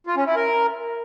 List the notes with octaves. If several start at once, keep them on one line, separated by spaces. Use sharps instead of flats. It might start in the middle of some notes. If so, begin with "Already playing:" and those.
F4
C#4
E4
A#4